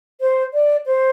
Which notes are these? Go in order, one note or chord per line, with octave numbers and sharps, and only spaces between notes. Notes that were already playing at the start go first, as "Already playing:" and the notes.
C5
D5
C5